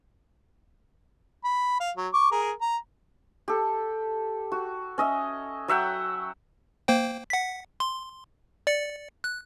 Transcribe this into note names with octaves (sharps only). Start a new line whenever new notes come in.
B5
F5
F#3
C#6 D6
G#4 A#4
A#5
G4 A4
F#4
C#4 D#5 E5
F#3 E5 F#5 G5
A#3 C5 G5
F#5 B6
C6
D5 C#7
F#6